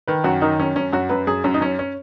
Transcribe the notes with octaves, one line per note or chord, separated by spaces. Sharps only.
D#3 B4
F#2 F#4
D#3 D#4
F#2 C#4
F#2 C#4
F#2 F#4
F#2 B4
F#2 G#4
F#2 C#4
D#4
F#2 C#4
C#4